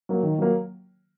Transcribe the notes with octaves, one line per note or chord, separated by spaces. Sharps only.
F#3 A#3
D#3
F#3 A#3